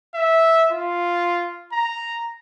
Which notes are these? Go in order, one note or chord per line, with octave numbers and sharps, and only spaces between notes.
E5
F4
A#5